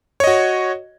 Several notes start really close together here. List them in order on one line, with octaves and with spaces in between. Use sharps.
C#5 D#5 F#4